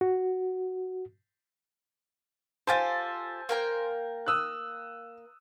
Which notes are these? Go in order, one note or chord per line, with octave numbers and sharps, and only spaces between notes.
F#4
F4 G4 A4 C5 G#5 A6
A#3 A#4 G5
D#6 E6 F#6